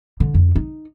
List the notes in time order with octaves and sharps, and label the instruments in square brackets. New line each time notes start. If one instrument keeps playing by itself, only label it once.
[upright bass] D3
F2
D#4